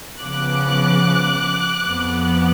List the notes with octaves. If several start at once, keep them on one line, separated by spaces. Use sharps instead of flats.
C#3 F3 B3 D6 F#6
F2 F3 B3